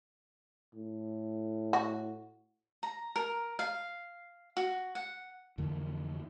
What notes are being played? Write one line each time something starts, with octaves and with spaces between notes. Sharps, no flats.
A2
F#4
A#5
A#4
F5
F#4
F#5
F2 D3 E3 A#3